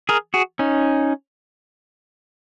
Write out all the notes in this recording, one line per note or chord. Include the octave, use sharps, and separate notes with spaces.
G#4 A#4
F#4 G#4
C#4 D#4